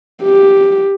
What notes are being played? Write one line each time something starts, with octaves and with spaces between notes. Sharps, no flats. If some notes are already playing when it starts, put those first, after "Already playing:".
G4